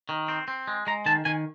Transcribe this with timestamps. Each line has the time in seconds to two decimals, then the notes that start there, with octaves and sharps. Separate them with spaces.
0.09 D#3
0.28 C4
0.48 C4
0.68 G#3
0.87 G#3 A#5
1.06 D#3 A5
1.25 D#3 G#5